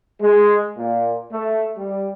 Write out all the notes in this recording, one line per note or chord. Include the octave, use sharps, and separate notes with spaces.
G#3
A#2
A3
G3